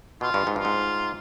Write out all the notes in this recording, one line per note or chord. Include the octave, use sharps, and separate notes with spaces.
B2 F4
G2
G#2
G2 F4
G#2